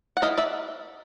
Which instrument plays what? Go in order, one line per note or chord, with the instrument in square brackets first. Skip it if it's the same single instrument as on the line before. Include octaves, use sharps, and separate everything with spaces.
[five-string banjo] F#5
E3 D#5 F5
D5 E5